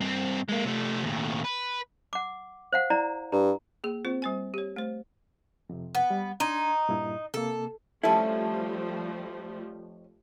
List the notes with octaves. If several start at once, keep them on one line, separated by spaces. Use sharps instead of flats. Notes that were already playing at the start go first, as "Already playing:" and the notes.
G2 C4
G#3 A#3
C3 A3
D#2 A2
B4
F#5 D6
C5 F5 F#5
E4 D5 A#5
G2 A#5
A#3 G#4
C4 F4 C5
G3 C5 G#5
G4 C#5
A3 C5
F2 C3
B3
G3
D4 D#4 C6 G#6
G2 A#2 E4
C3 A#3 A4
F2 F3 G3 A3 C#4 E4 A4